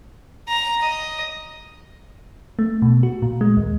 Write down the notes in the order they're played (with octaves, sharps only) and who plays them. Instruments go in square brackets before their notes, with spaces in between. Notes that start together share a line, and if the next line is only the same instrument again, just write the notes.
[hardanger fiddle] A#5
D#5
[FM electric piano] A3
B2
F#4
A#2
G#3
D#2